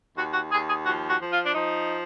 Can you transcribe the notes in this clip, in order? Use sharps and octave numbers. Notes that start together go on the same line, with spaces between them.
D#2 F#4
F#4
D#2 G#4
G#4
F3 F#4
F#4
F3
F4
D4
F3 D#4